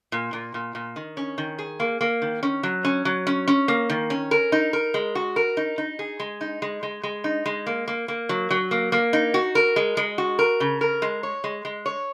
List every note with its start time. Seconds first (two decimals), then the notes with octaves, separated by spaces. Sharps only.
0.12 A#2
0.33 A#2
0.54 A#2
0.75 A#2
0.96 D#3
1.17 C#4
1.38 D#3
1.58 G#4
1.80 A#3
2.01 A#3
2.22 D#3
2.43 C#4
2.63 F#3
2.85 C#4
3.05 F#3
3.27 C#4
3.48 C#4
3.68 A#3
3.90 D#3
4.10 C#4
4.31 A#4
4.52 D#4
4.73 A#4
4.94 G#3
5.15 F#4
5.36 A#4
5.57 D#4
5.78 D#4
5.99 G#4
6.20 G#3
6.41 D#4
6.62 G#3
6.83 G#3
7.03 G#3
7.24 D#4
7.46 G#3
7.66 A#3
7.88 A#3
8.08 A#3
8.29 F#3
8.50 F#3
8.71 A#3
8.92 A#3
9.13 D#4
9.34 F#4
9.55 A#4
9.76 G#3
9.97 G#3
10.18 F#4
10.39 A#4
10.60 C#3
10.81 A#4
11.02 G#3
11.23 C#5
11.44 G#3
11.65 G#3
11.86 C#5